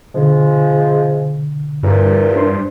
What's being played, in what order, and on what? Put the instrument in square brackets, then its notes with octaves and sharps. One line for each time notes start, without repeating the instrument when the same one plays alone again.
[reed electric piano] B2 D3 [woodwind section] F3 G#3
[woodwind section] E2 A#2 [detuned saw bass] G2
[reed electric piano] D4 C5 C6